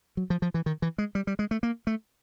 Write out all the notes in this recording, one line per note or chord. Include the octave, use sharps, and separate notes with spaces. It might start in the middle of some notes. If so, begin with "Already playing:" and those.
F#3
F3
F3
E3
D#3
E3
G#3
G3
G3
G#3
A3
A#3
A3